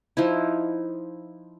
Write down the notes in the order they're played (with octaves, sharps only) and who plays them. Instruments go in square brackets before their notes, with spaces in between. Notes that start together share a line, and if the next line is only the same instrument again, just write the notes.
[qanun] F3 D#4 E4